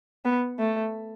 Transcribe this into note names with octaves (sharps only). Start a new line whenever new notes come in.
B3
A3